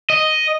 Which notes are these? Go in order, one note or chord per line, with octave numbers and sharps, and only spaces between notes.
D#5